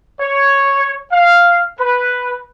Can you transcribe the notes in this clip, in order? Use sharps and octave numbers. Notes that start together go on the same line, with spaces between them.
C#5
F5
B4